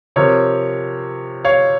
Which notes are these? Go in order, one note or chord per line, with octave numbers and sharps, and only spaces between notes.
C3 F3 A#4 C#5
C#5 F5